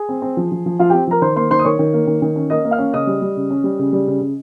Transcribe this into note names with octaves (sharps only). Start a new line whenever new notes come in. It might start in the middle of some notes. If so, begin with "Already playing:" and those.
Already playing: G#4 G#5
C4
C4
F3
F3
F3
F3 F4 F5
C4 G4 G5
F3 A#4 A#5
D#3 C5 C6
A#3 C5 C6
D#3 C5 C6
D#6
D#3 C#5 C#6
D#3
A#3
D#3
D#3
C#4
A#3 D#5 D#6
A#3
F5 F6
C#4
C#3 D#5 D#6
G3
G3
C#3
C#4
G3
C#3
G3
C#3
C#3